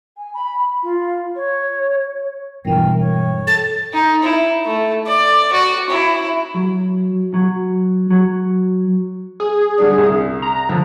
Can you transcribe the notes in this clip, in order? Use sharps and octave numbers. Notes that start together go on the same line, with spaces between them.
G#5
B5
F4
C#5
E1 G2 B2 E3 A#4 G5
C#5
A4 A6
D#4
E4
A3
D5
F#4
E4
F#3
F#3
F#3
G#4
D3 G3 D4
C2
A#5
D3 F3